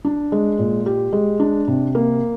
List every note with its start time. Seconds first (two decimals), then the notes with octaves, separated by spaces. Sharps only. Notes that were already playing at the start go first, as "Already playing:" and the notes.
0.05 D4
0.32 G#3
0.59 A#2
0.86 G4
1.13 G#3
1.40 D4
1.68 C3
1.95 A#3